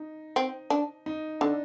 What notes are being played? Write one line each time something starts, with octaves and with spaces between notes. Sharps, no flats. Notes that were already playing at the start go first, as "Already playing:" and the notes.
Already playing: D#4
C4
D4
D#4
D3 D4